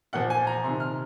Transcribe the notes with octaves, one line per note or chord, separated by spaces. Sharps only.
A#2 F3 F#5
G#5
A#5
C3 D#3 C6
F6